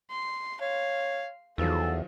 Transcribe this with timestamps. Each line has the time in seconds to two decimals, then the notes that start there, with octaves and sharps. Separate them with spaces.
0.11 C6
0.61 C#5 F5
1.58 E2 D#3 F3 F#3 G#4 A4